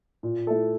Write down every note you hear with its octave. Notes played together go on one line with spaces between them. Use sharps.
A#2
A3 E4 A4